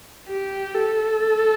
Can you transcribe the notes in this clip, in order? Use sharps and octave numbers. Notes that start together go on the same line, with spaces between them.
G4
A4